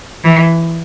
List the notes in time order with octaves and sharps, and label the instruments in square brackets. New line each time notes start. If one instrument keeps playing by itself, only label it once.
[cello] E3